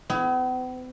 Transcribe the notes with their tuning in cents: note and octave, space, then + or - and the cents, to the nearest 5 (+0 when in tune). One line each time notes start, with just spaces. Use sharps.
B3 +45 E4 +15